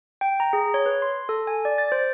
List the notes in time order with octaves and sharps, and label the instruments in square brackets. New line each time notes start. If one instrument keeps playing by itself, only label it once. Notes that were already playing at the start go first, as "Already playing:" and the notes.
[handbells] G5
A#5
G#4
C#5
B4
C6
A4
G#5
D5
A6
C5